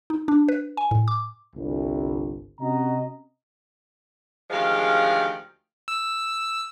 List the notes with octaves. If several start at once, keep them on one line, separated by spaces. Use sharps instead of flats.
D#4
D4
B4
G#5
A2
D6
G1 C2
C3 C#4 F#4 D#5 A#5
D2 D#3 F3 G#3 G4 F5
E6